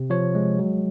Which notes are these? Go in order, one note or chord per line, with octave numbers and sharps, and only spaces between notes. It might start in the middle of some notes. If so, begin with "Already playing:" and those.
Already playing: C3
F3 C#5
G#3
F#3